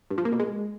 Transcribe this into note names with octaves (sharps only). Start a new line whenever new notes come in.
G2
F3
A#3
B2
G#3